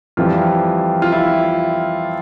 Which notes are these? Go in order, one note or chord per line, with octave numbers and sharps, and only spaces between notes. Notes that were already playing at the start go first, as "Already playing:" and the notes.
F2 E3 G3 F4
F4
E4